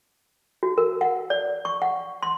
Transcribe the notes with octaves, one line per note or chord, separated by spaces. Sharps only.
F#4
A#4
F#5
D5
C#6
F#5
C6